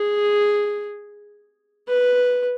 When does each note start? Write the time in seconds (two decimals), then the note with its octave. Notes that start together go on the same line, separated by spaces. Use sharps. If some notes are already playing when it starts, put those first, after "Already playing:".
Already playing: G#4
1.88 B4